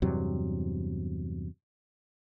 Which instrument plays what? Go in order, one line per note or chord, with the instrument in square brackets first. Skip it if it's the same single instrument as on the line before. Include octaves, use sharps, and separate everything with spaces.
[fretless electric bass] E2 G2 C3 F#3